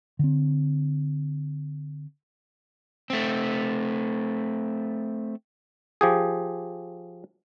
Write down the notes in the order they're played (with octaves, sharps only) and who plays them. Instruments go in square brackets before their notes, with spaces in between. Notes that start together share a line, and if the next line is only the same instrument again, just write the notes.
[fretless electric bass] D3 C4
[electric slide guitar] A3 C4
[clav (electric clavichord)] F3 G4 G#4